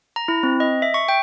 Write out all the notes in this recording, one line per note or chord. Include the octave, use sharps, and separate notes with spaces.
A#5
E4
C4
D#5
E5
C#6
G5